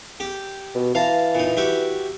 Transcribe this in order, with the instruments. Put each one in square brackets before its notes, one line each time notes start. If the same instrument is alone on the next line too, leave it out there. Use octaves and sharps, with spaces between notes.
[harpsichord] G4
[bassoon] B2
[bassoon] E3 [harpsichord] F5 A5 A#5
[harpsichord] A#2 D#4
F#4 G4 E5